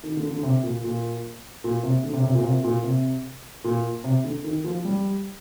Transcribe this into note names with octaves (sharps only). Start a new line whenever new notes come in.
D#3
D3
D3
C3
A#2
A#2
A#2
C3
D3
C3
C3
A#2
C3
A#2
C3
A#2
C3
D3
D#3
F3
G3